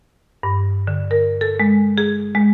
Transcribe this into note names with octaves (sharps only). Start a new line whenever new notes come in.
G2
D3
A#4
A4
G#3
G#4
G#3